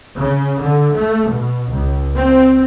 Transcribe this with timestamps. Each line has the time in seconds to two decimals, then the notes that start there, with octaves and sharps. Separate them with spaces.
0.17 C#3
0.59 D3
0.94 A3
1.28 B2
1.68 C#2
2.14 C4